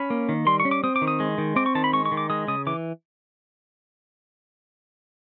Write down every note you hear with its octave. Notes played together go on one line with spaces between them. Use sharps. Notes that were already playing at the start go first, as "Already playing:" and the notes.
Already playing: C#4 B5
A#3
D#3
G3 C6
C#6
C#4
D6
C4 D#6
D6
D#3
D#6
G#3
D#3
C4 D6
C#6
D#3 A5
B5
G#3 C#6
C#6
D#3
D6
G#3 D#6
C#3 D#6
E3 D6